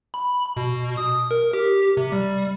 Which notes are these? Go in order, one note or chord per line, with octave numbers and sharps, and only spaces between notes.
B5
B2
D#6
A#4
G4
C3
G3